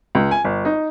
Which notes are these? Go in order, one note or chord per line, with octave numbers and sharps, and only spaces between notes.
C#2
G#5
G1
D#4